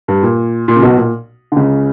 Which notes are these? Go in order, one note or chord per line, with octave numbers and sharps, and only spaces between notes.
G2
A#2
A#2
C#3
B1 B2
A#2
D3
C#2 C#3